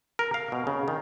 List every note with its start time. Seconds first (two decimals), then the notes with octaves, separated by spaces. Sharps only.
0.19 A#4
0.34 F5
0.52 B2
0.67 C#3
0.88 D#3